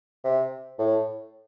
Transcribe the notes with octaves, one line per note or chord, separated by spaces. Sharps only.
C3
A2